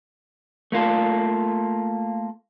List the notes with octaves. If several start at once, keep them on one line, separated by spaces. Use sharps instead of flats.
A3 A#3 F4 A4